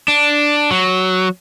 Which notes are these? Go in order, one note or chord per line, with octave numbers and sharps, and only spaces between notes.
D4
F#3